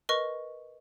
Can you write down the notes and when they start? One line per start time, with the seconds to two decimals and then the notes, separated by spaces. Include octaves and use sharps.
0.09 A#4 B4 D#5 C#6